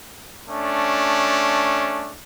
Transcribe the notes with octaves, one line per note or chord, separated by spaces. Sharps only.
A3 C#4 D4